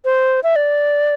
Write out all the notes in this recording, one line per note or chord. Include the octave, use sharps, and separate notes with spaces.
C5
E5
D5